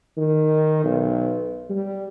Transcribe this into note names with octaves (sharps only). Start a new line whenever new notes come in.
D#3
B1
G3